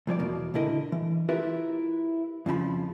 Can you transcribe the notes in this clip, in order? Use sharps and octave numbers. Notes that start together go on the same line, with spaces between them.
C2 F3 C#5 D5
E2 B2 A#3
C#2 A#2 D3 E4 A#4 D#5
E3
E4 F4 G4 A#4 B4 E5
F2 C#3 F3 B5